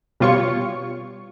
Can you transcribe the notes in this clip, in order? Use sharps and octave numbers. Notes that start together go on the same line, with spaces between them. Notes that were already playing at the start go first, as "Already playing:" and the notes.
B2 G3 F4 C#5 C#6